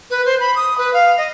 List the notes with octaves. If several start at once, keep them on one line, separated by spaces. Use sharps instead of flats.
B4
C5
B5
D#6
B4
F5
D#5